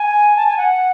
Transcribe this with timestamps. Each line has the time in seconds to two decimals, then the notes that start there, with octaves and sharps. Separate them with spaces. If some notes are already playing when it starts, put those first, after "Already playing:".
Already playing: G#5
0.36 A5
0.46 G#5
0.57 F#5